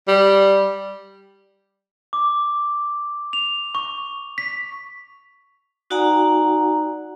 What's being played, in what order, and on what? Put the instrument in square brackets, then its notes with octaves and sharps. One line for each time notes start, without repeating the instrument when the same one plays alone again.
[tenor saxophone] G3
[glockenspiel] D6
F7
C#6
B6
[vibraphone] D#4 F#4 D5 F#5 G#5 A#5